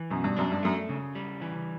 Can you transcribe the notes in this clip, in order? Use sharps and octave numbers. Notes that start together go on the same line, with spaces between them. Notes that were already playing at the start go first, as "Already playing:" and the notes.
Already playing: E3
F#2 B2
G2
F#2 D4
G2
F#2 A3
C#3
G3
E3